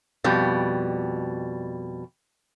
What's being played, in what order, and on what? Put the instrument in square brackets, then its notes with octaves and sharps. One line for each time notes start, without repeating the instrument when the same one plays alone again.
[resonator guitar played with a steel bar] F2 B2 G3